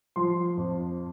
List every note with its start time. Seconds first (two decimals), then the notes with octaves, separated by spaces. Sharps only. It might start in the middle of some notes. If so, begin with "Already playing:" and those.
0.16 F3 C6
0.57 F2